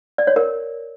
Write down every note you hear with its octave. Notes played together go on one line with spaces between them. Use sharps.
D5
C#5
A#4